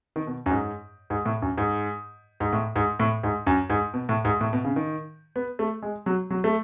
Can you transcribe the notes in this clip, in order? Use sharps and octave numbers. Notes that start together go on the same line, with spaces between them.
D#3
B2
F#2
G#2
G#2
A2
F#2
G#2
G#2
A2
G#2
A2
G#2
F#2
G#2
B2
A2
G#2
A2
B2
C#3
D#3
B3
A3
G#3
F#3
F#3
A3